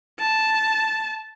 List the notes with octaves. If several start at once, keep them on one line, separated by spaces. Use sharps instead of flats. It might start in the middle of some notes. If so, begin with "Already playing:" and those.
A5